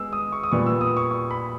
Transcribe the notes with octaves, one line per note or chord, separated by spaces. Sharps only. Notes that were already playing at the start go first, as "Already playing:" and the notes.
Already playing: G#3 B3 E6
D#6
C#6
D#6
A#2 G3 B3 C#6
E6
D#6
C#6
C#6
B5